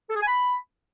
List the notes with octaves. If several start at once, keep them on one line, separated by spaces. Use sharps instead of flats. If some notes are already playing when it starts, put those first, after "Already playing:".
A4
G#4
G#5
B5